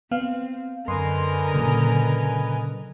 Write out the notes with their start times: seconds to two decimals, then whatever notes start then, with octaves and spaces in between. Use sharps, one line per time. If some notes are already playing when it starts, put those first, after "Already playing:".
0.11 B3 C4 F5
0.88 F#2 D3 A#4 B4 D#5 G#5 C6
1.54 A#2 C#3 F#3